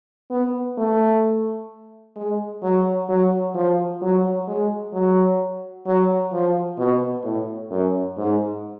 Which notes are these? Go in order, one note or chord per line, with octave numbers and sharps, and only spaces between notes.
B3
A3
G#3
F#3
F#3
F3
F#3
G#3
F#3
F#3
F3
B2
A2
F#2
G#2